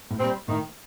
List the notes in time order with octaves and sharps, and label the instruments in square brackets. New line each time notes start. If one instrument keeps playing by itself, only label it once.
[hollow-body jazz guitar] A2
[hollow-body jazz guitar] A#2 [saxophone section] G3 C4
[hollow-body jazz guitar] A2 [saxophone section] D#3